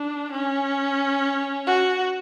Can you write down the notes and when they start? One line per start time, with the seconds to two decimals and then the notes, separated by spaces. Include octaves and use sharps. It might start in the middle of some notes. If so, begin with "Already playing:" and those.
Already playing: D4
0.32 C#4
1.67 F#4